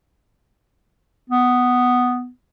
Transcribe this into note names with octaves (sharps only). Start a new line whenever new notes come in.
B3